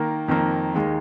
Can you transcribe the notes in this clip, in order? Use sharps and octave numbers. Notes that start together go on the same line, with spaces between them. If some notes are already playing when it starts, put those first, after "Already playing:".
Already playing: D#3 A#3
F2 D#3 A#3
D#2 D#3 G#3